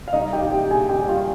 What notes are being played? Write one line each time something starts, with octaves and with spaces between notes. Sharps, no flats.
F5
G3 D#4 D#5
G4 G5
A#1
G4 G5
A#1 G#4 G#5
G4 G5
G3
F4 F5